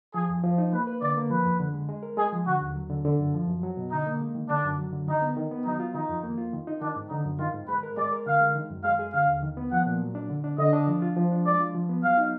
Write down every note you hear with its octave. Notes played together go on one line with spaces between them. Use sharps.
F3 G#4
F2
F3
D#4
A#3 B4
B4
D3 D5
A#3
F3 B4
F2
D3
G#3
G#3
A#4
G#3 G#4
F3
D3 F#4
D#2
F#3
D3
D3
F#2
F3
F#2
F#3
B2
D3 D#4
A#3
G#3
D#3
D3 D4
F#2
F#3
D3
D#3 D#4
B3
D#3
B3
F#3 D#4
F4
D#3 D#4
F2
A#3
F4
D#3
D#4
D#3 D4
G#2
D3 D#4
F#2
D#3 F4
G#2
G#3 B4
A#4
G#3 D5
A#4
D3 F5
G#3
D#3
F#2
G#3 F5
G#4
D3 F5
D#2
D#3
B3
F3 F#5
A#2
F#3
D4
D3
D4
D3 D#5
D4
F3
F4
F3
D4
G#3 D5
F4
F3
B3
F#3 F5
D#4